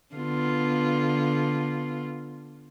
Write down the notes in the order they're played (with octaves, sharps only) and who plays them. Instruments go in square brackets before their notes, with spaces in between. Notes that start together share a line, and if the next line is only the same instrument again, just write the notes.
[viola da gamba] D3 B3 F4